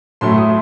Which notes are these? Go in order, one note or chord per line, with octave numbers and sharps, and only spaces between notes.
A2 F#3 A3 E4 C6
D#6